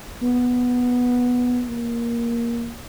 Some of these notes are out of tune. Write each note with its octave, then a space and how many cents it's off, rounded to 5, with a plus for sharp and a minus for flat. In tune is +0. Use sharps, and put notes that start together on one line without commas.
B3 -5
A#3 +10